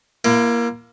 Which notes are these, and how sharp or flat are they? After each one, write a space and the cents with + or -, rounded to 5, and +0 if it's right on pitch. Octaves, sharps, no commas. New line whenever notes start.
A#3 +15 E4 +45